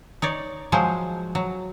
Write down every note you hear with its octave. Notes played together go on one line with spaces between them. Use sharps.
D#4 C#5 D5
F3 F#3 G#3 G#4 C5
F#3